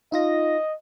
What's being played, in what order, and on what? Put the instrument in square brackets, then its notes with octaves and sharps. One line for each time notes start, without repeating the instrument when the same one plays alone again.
[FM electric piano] D#4 F4 A#6 [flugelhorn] D#5